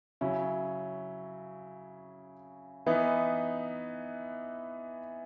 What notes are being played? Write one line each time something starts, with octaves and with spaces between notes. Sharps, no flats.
C#3 F#3 C#4 E4
E3 B3 D#4